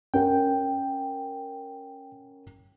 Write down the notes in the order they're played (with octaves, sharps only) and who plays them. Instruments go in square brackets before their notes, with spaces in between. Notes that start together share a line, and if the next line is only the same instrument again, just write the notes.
[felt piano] C#4 A#4 F#5 [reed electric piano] G5